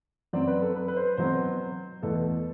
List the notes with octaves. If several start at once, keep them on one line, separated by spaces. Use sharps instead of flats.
F#2 F#3 C4 D5
B4
A4
B4
B4
C5
B2 F#3 C4 C5
E2 B2 A3 A4